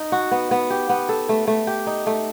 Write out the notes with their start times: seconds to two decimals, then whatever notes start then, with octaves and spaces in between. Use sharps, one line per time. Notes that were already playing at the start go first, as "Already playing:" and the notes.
Already playing: D#4
0.12 F#4
0.31 B3
0.51 B3
0.70 G4
0.89 B3
1.09 A4
1.29 A3
1.47 A3
1.67 G4
1.87 D#4
2.06 A3